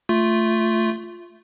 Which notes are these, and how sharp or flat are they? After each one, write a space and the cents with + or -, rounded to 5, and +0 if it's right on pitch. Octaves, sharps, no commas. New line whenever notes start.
A3 +10 F4 +0